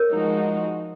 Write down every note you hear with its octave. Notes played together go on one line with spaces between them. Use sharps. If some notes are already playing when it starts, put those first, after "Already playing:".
Already playing: A#4 C#5
F3 G#3 D#4 F#4